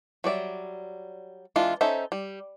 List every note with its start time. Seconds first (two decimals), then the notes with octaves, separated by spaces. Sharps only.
0.24 F#3 G3 D5 E5
1.56 E3 G#3 D4 F4
1.81 C#4 D#4 A4 C5 E5
2.12 G3